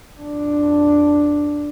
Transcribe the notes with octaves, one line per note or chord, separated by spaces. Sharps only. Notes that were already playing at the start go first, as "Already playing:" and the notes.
F2 D4